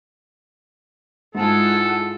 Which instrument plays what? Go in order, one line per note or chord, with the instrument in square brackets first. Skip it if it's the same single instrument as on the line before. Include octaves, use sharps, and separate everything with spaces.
[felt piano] G#2 [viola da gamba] G#3 E4 F4 [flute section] G#4 F#5 A5 [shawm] A4